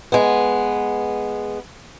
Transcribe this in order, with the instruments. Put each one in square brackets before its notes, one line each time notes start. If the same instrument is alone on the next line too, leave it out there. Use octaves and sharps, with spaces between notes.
[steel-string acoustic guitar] G#3 B3